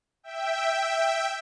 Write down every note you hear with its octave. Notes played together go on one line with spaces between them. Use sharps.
E5 G5